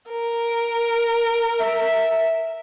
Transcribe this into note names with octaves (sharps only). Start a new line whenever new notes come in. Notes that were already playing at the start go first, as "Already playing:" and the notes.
A#4
E5